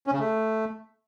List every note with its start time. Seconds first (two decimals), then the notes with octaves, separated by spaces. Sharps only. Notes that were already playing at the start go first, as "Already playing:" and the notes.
0.07 C#4
0.13 C#3
0.19 A3